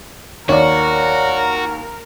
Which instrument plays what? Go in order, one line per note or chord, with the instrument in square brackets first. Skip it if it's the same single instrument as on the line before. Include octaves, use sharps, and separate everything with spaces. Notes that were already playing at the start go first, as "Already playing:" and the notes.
[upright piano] D#2 [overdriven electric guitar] F#4 [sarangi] A#4 [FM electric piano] C#5 D5